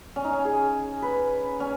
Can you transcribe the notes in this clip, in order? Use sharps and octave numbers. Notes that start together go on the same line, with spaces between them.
C#4
D#4
C#4
G#4
B4
C#4